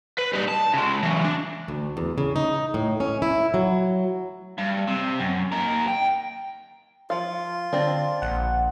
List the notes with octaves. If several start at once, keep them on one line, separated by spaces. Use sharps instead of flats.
B4
G3 D#4
A5
C#3 G#3
E3 F#3
D4
D2
E2
C#3
D#4
A2
C#4
E4
F#3
G2
C3
F#2
D#2 A#4
G5
F3 F4 F5
D3 C4 D4
A#1 F#5